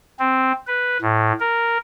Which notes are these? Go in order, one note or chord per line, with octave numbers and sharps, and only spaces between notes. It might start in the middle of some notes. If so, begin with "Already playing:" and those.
C4
B4
A2
A#4